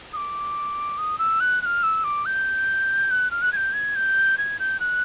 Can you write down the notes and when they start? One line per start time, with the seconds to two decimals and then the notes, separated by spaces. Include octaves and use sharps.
0.13 D#6
0.17 D6
0.98 D#6
1.19 E6
1.40 F#6
1.62 F#6
1.66 F6
1.83 E6
2.04 D6
2.26 G6
3.11 F#6
3.31 F6
3.42 F#6
3.53 G#6
3.56 G6
3.73 G#6
3.96 G6
4.38 G#6
4.60 G6
4.80 F#6